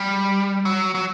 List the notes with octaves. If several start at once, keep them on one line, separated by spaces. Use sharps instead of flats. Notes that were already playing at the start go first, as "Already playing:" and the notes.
Already playing: G3
F#3
F#3